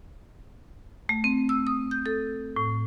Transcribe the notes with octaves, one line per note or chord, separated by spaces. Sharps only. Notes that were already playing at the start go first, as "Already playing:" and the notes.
A3
C4
E6
D#6
G6
A4
A2